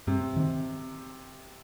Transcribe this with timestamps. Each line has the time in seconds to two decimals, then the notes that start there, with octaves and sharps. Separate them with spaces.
0.07 G2 C3
0.36 D#3 C4